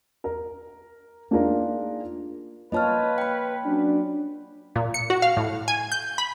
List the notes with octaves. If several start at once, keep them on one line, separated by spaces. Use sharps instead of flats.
A#4
A#3 D4 D#4 F4 G#4 A#4
A#3 F4 B4 C#5 D#5 A5 F6
G5 B5
F#3 C#4 D4
A#2
C#7
F#4
F5
A2
G#5
G6
B5